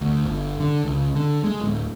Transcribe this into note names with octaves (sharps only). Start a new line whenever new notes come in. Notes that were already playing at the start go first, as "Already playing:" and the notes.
D2
G1
D3
C#2
D3
G#3
D1